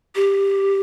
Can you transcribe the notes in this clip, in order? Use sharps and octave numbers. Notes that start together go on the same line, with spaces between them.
G4